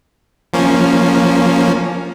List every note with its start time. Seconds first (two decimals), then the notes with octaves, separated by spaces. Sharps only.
0.53 F3 A#3 C#4